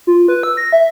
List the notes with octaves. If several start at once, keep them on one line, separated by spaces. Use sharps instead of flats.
F4
B4
E6
A#6
E5